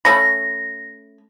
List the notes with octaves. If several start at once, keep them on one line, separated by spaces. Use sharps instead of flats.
A3 C#4 B5 A#6